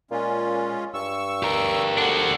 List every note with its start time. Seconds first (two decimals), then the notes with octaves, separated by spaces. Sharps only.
0.11 A#2 G#3 C#4 F4
0.94 G2 C#6 E6
1.43 G4 A#4
1.98 D3 D4 F#4